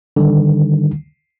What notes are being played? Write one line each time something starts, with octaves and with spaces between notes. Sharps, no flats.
D3 D#3 G3